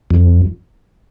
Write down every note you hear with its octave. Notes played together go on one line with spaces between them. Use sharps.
F2